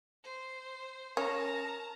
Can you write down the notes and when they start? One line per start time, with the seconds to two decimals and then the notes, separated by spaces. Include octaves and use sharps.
0.24 C5
1.17 C#4 A#4 A5 A#5